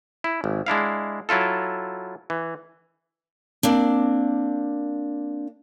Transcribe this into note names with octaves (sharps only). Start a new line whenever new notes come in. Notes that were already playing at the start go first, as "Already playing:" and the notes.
E4
G#1
G#3 D4 E4 F5
F#3 E4 F4 A4
E3
A#3 C4 D4